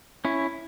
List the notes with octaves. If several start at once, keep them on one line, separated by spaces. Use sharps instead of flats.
C#4 E4